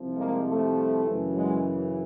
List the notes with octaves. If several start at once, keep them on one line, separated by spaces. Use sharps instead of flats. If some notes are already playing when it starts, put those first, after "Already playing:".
Already playing: C2 C3 F3
G#3 A#3
G3 A3
F#2 C#3 E3
F#3 G#3